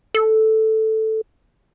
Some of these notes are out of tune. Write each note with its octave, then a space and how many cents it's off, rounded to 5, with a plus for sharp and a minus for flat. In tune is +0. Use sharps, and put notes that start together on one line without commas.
A4 +0